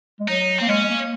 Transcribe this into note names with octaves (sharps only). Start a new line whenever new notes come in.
G#3
F#3 D#4
A#3 C4
G#3 C#4
G#3
A#3